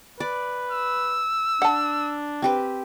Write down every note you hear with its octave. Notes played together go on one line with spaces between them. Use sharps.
B4 D5
E6
D4 F#5 A5
C4 G4 B4